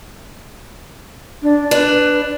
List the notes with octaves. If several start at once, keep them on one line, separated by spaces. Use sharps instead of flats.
D4
D4 B4